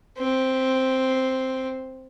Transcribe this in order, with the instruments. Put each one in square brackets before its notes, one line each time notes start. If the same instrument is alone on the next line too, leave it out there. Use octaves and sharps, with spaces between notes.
[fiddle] C4